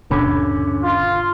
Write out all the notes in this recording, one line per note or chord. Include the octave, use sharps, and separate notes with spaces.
D#1 G2 B2 D3 C#4 D4
F4